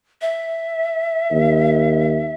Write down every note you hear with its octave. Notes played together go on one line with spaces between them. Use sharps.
E5
D#2